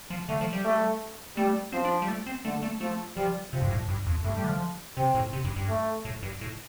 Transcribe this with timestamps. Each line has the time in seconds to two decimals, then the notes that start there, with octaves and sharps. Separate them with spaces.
0.10 F3
0.29 D3 A3
0.41 F3
0.53 G3
0.65 A3
1.37 G3 A3
1.72 F3 C4
1.85 D4
2.02 G3
2.08 A3
2.26 C4
2.45 D3 A3
2.63 A3
2.80 F3 A3
3.16 F3 G3
3.53 C3 F3
3.62 G2
3.71 A2
3.89 G2
4.07 F2
4.24 G2 A3
4.37 G3
4.44 D3
4.49 F3
4.97 C3 C4
5.15 A2
5.33 C3
5.44 G2
5.56 G2
5.69 A3
6.05 A2
6.23 G2
6.41 A2